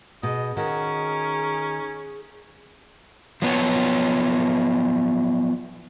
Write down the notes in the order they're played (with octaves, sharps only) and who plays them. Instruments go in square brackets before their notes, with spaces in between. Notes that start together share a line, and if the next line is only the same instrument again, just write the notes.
[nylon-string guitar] B2 [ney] G#4 [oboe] D#5
[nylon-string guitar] D#3 F#4 [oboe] C#4 [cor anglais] A#4
[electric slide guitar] F3 F#3 B3 C#5